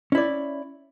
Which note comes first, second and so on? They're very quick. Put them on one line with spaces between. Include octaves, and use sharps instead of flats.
C#4 E4 D5